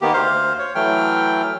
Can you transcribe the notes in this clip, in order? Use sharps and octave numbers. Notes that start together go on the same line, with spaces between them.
D#3 A#3 B3 G4
D2 C5 F5
C#5
E3 F#3 A3 G5 F6